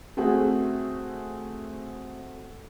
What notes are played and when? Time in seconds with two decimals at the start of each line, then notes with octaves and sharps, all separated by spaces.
0.17 A3 C4 F#4 G#4